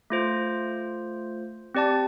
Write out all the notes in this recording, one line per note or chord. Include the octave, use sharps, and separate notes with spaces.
A3 F4 C5
C4 G4 D5 A5